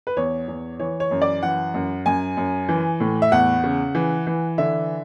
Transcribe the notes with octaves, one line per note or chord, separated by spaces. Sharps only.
B4
E2 C#5
E2
E3 C#5
C#5
F#2
D5
E3 F#5
F#2
F#2 G#5
F#2
E3
A2
E5
E2 F#5
C#3
E3
E3
D3 E5